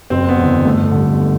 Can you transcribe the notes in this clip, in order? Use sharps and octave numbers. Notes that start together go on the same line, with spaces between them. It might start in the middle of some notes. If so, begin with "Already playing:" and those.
F#1 C4
B3
E2 D3
G1 A3
G2 D3